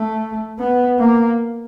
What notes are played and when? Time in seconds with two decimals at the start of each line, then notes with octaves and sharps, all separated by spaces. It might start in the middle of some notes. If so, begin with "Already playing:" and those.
Already playing: A3
0.59 B3
0.99 A#3